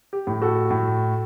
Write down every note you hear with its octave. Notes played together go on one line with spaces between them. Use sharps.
G4
A2
F#4 A4
A2